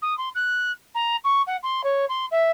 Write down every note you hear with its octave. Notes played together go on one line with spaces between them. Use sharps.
D#6
C6
F#6
A#5
C#6
F#5
C6
C#5
C6
E5